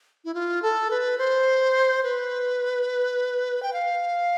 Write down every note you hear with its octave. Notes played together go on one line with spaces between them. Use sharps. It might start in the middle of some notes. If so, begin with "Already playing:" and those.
E4
F4
A4
B4
C5
B4
G5
F5